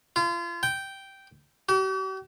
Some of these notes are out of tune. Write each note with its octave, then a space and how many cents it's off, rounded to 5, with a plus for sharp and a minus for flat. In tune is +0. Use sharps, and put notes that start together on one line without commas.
F4 -35
G5 -5
G4 -45